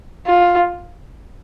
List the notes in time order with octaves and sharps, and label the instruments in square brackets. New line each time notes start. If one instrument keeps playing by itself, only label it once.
[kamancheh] F4